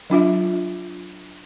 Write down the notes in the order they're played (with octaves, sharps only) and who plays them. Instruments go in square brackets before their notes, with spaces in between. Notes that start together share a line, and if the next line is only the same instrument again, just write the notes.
[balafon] F#3 D4 F4 E5